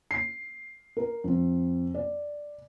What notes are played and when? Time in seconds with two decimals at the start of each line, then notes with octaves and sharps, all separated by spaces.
0.11 C7
0.97 A#4
1.24 F2
1.94 D5